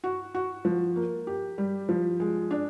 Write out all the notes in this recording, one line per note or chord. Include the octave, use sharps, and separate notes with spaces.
F#4
F#4
F3
A#3
G4
G3
F3
G#3
D4